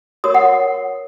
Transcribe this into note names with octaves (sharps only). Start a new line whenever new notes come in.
F#4 A#4 C#5 D#6
F#5